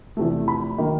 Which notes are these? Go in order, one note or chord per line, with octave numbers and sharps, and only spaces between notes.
E2 C3 F3 A3
B5
D#3 F#3 A#3